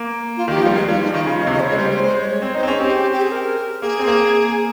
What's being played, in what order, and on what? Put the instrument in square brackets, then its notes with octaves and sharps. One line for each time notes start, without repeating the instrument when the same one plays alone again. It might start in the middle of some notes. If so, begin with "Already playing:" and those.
Already playing: [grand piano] A#3
[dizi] F4
[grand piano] D#3 [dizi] G4
[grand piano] F3
[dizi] F4
[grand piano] G3
[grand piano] G#3 [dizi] D#4
[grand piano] G3 [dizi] F4
[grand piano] F3 [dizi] D#4
[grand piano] D#3 [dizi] F4
[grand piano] C#3 [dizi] F4
[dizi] D#5
[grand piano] C3
[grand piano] C#3 [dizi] D#5
[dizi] C5
C#5
[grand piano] G#3
[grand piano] G3 [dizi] C5
[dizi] C5
[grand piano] G#3 [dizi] C5
[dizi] C#5
C#5
[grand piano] C4 [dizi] C#5
[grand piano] D#4 [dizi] C5
[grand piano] C4
[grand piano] C#4 [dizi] G#4
[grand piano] C4 [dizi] G4
[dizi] G4
G#4
A#4
[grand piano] A#3 [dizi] G#4
[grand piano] C4
A#3